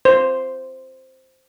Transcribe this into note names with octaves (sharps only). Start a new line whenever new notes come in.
C5